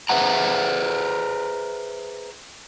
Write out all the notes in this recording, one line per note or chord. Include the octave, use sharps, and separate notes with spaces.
G#4 B4 C5 E5 F#5 A#5